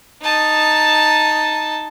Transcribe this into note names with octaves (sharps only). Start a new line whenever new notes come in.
D#4 A5